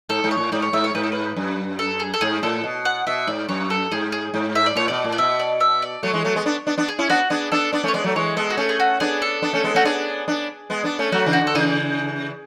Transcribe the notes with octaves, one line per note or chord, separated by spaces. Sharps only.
G#2 A4
G#2
C#5
A2
G#2 D5
C#5
G#2 E5
C#5
G#2 B4
A4
B4
F#2
A4
G#4
A4
G#2 G#4
A2 A4
B2
F#5
B2 E5
G#2 D5
F#2 C#5
A4
G#2 G#4
G#4
G#2
E5
D5
A2 C#5
B2 D5
A2
D5
B2 E5
D5
E5
D5
F#3 A3 C#5
E3 G#3
F#3 A3
G#3 B3
B3 D4
B3 D4
B3 D4
G#4
C#4 E4
B3 D4 F#4
B3 D4 G#4
B3 D4 A4
B3 D4 D5
A3 C#4 C#5
G#3 B3 D5
F#3 A3
E3 G#3 C#5
G#3 B3 A4
F#4
A3 C#4 G#4
G#4
F#4
B3 D4 G#4
A4
B3 D4
A3 C#4
G#3 B3
A3 C#4 F#4
B3 D4 G#4
B3 D4
G#3 B3
B3 D4
A3 C#4
F#3 A3 F#4
C#3 E3
F#4
D3
A4
C#3 E3 G#4